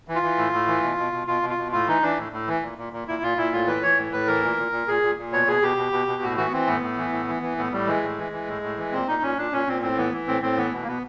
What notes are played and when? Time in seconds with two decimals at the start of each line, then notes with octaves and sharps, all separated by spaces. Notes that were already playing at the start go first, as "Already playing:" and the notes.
0.08 E3
0.15 F4
0.23 E3
0.38 A2
0.53 A2
0.67 E3
0.83 B2
0.98 B2
1.13 B2
1.27 B2 F4
1.42 B2
1.50 F4
1.58 B2
1.72 A2 F4
1.88 E3 D#4
2.02 E3 D4
2.17 A2
2.33 A2
2.47 E3
2.63 A#2
2.78 A#2
2.93 A#2
3.08 A#2 E4
3.23 A#2 F4
3.37 A#2 E4
3.53 A2 F4
3.67 E3 B4
3.82 E3 C#5
3.98 A2
4.12 A2 B4
4.27 E3 A#4
4.43 A#2
4.58 A#2
4.72 A#2
4.88 A#2 G#4
5.02 A#2
5.17 A#2
5.32 B2 C#5
5.47 B2 G#4
5.62 B2 G4
5.77 B2
5.92 B2
6.07 B2
6.22 A2 F#4
6.37 E3 F#4
6.48 B3
6.52 E3 C4
6.67 A2 B3
6.82 A2
6.98 E3
7.12 A2
7.28 E3
7.43 E3
7.57 A2 B3
7.72 A2 G3
7.87 E3 G#3
8.03 A2
8.18 E3
8.32 E3
8.47 A2
8.63 A2
8.78 E3
8.92 A#2 C4
9.07 A#2 D#4
9.22 A#2 C#4
9.38 A#2 D4
9.52 A#2 C#4
9.67 A#2 C4
9.82 A2 C4
9.97 E3 B3
10.12 E3
10.27 A2 C4
10.42 A2 C4
10.57 E3 B3
10.73 B2
10.83 A#3
10.87 B2 B3